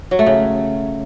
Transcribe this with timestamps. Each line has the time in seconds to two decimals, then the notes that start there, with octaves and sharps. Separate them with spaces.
0.11 F#3
0.19 A3
0.27 C#3